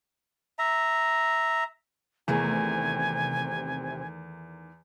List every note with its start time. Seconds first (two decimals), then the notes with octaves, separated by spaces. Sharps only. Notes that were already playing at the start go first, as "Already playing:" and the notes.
0.59 E5 A#5
2.28 E2 C3 D#3 A3 G#4 G#5